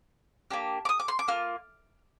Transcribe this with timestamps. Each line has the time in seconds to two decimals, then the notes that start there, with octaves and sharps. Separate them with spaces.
0.51 A#3 D4 G4
0.85 D6
0.89 D#6
1.00 D6
1.08 C6
1.19 D6
1.28 A#3 F4 F6